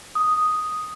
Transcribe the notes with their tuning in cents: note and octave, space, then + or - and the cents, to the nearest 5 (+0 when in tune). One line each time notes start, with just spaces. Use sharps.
D#6 +0